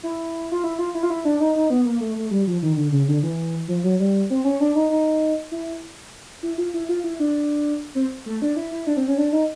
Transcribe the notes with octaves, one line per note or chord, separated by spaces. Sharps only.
E4
F4
E4
F4
E4
F4
E4
D4
D#4
D#4
B3
A#3
A3
A3
G3
F3
D#3
D3
C#3
D3
E3
F3
F#3
G3
C4
C#4
D4
D#4
D#4
E4
E4
F4
E4
F4
E4
D4
C4
A3
D4
E4
E4
D4
C4
C#4
D4
D#4